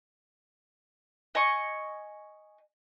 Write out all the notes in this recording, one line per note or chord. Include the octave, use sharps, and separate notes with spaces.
D#5 G#5 C#6